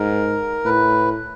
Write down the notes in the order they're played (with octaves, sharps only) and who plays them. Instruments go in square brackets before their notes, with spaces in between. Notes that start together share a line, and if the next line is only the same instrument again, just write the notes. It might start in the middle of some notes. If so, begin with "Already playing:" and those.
Already playing: [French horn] G#2 [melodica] A#4
[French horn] A2 [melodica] B4